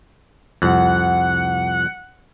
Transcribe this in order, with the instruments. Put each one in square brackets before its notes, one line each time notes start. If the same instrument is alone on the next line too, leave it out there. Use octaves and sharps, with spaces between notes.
[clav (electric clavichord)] C2 F2 [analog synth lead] F#5